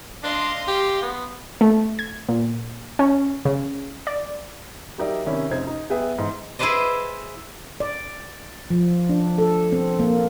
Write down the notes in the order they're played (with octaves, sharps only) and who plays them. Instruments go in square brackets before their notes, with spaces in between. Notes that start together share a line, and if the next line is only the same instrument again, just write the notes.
[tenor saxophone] D4 [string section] D#5 F5 C6
[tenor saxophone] G4
B3
[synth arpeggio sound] A3
G#6
A#2
C#4
C#3
D5
[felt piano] F#3 D#4 G4 A#4 D5 E5
C3 D#3 C#4 E4
F1 C#3 D#4 C5 G#6
D#4
B3 G#4 B4 E5 G5
G#2 E3
[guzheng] E4 G#4 B4 C5 D5 D#5
[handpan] D5
F3
D4
A4
C4
A#3